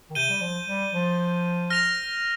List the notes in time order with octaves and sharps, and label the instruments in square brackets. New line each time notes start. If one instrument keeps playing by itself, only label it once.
[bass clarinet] D#3
[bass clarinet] C3 [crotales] G6 D#7 G7
[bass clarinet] G3
F3
G3
F3
[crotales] F6 A#6 F7